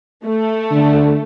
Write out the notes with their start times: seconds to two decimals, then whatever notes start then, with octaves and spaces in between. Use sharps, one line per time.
0.25 A3
0.71 D3